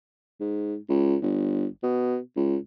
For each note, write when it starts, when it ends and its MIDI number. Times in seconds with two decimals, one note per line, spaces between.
0.40 0.76 44
0.89 1.16 37
1.22 1.66 31
1.83 2.18 47
2.36 2.56 37